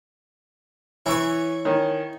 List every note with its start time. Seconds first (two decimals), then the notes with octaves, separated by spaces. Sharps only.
1.06 E3 C#4 E4 C#5 C#6
1.65 D#3 C#4